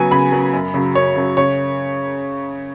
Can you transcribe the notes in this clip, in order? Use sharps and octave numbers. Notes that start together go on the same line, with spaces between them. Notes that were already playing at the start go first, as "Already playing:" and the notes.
Already playing: C#3 F#3 B3 G#5
C#3 B5
F#3 B3
F#2
C#3 F#3
F#2 C#5
C#3 F#3
C#3 C#5